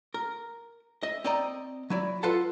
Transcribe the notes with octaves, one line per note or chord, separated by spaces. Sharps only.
A#4
D#5 E5
C4 D5 D#5 G5 A#5
F#3 E4 D5
F4 A4 B4 F5 F#5 A5